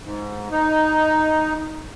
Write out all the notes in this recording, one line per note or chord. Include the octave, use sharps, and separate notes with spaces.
G#2
D#4